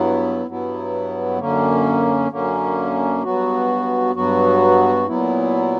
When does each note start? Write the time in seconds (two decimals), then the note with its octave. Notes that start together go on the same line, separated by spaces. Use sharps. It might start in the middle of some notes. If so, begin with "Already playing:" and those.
Already playing: G2 F#3 B3 E4
0.47 G2 F#3 B3 E4
1.39 F#2 D3 A#3 C#4
2.30 F#2 D3 A#3 C#4
3.23 G2 F#3 B3 F#4
4.15 G2 F#3 B3 F#4
5.08 A#2 F#3 B3 E4